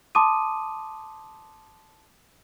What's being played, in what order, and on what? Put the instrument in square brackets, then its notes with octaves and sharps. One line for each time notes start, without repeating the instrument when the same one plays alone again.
[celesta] A5 C6 D6 D#6 D#7